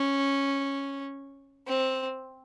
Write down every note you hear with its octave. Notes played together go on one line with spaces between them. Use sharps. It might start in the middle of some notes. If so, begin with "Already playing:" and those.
Already playing: C#4
C4